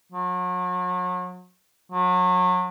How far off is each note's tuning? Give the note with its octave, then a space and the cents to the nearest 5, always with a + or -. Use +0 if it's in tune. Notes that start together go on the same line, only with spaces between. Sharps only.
F#3 -35
F#3 -30